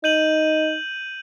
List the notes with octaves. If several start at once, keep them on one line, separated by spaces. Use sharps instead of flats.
D#4 G6 D#7 F#7